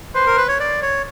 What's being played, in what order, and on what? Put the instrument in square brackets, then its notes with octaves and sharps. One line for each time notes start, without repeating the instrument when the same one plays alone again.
[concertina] B4 [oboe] C5
[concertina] A#4
B4
C#5
D5
C#5